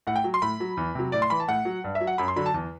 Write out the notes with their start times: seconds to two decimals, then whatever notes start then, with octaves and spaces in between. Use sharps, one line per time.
0.07 A2 F#5
0.16 G5
0.24 F#3
0.34 C6
0.42 A2 B5
0.60 F#3
0.77 E2
0.95 C3 F#3
1.12 A2 D5
1.22 C6
1.30 E3 B5
1.40 A5
1.48 A2 F#5
1.65 F#3
1.84 G2
1.95 E5
2.01 F#3
2.07 F#5
2.18 F#2 B5
2.28 C6
2.36 D3 F#3 B5
2.46 A5
2.54 E2